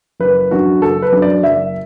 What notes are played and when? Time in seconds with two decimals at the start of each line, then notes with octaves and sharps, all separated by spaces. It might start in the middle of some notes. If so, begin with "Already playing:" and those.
0.20 F#1 B4
0.51 F#2 F#3 D4 F#4
0.81 F#1 A4
1.02 B4
1.12 F#2 F#3 D4
1.22 D5
1.42 F#1 E5